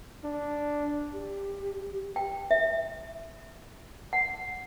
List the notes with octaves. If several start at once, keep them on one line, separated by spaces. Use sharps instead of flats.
D4
G4
G5
E5
F#5